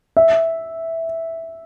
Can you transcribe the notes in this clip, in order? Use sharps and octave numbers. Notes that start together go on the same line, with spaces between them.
E5